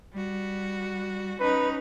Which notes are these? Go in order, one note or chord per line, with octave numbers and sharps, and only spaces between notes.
G3 F#4
C#4 D#4 B4